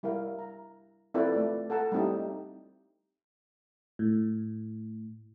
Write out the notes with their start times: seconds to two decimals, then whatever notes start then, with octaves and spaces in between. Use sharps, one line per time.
0.03 G3 E4 A#4 F5
0.39 A#5
1.14 C4 E4 F4 A4 B4 D5
1.33 A3 D5
1.70 A4 F#5 A5 A#5
1.92 G3 A3 C4 D#4 E4 G4
3.99 A2